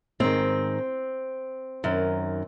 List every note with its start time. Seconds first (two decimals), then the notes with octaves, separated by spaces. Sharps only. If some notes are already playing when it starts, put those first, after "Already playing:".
0.20 G#2 D#3 C4
1.84 F#2 D#3